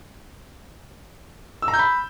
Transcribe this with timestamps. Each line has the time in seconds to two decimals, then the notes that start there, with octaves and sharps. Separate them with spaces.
1.62 E6
1.68 A#5
1.74 G6
1.79 B5